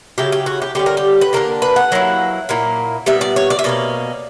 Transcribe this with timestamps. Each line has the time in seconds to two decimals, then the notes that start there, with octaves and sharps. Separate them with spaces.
0.18 C#3 F#3 C#4 E4 G4
0.32 G4
0.46 F#4
0.62 G4
0.75 D3 G3 C#4 G4
0.86 A#4
0.97 G4
1.21 B4
1.33 D3 F#3 A#3 D4 A#4
1.62 B4
1.76 F#5
1.92 F#3 A#3 E4
2.49 A#2 A#3 E4
3.06 A#2 G3 B3 E5
3.21 D5
3.36 C#5
3.50 D5
3.59 E5
3.64 B2 A#3 C#4 D5